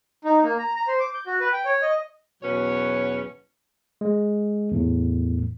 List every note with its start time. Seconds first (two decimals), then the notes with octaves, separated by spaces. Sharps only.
0.24 D#4
0.43 A#3
0.58 A#5
0.76 A#5
0.88 C5
1.00 D6
1.14 G6
1.27 F#4
1.40 B4
1.53 G5
1.65 C#5
1.82 D#5
2.43 E2 B2 F#3 C#4 B4 C#5
4.01 G#3
4.72 E2 A2